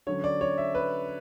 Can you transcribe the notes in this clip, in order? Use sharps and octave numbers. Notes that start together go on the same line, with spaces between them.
D3 F#3 C#4 C#5
D5
C#5
E5
B4